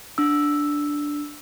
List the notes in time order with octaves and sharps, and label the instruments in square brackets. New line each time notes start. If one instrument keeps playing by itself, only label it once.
[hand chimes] D4 E6